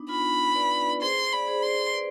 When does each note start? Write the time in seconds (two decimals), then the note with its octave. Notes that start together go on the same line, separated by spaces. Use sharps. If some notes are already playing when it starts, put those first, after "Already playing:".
Already playing: B3 D4 D#4
0.09 F4 B5
0.55 B4 D5
1.02 G#4 C5 C6
1.32 D5 B5
1.48 G#4 C5
1.62 C6
1.93 B4 D5